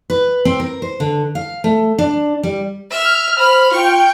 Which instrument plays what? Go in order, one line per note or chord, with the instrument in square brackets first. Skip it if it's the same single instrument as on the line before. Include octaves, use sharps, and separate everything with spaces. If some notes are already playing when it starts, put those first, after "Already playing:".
[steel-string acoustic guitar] B4
C4
A#4
C5
D3
F5
A3
D4
G3
[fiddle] E5 [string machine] F6
[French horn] C5 [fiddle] B5
[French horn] F4 [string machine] G5 [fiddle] C#6